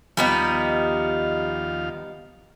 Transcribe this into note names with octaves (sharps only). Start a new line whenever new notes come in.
D#2 F3 G3 B3 D#4 F5